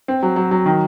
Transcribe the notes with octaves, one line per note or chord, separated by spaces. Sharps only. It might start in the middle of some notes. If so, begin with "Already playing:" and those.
C4
F#3
F#3
F#3
D#3